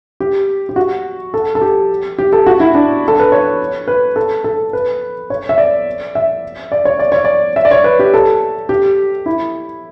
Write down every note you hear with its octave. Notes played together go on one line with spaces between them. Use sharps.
G4
G4
F#4
A4
A4
G4
G4
A4
F#4
E4
D4
A4
B4
C#5
B4
A4
A4
B4
C#5
E5
D5
E5
D5
C#5
D5
C#5
D5
E5
D5
C#5
B4
G4
A4
G4
E4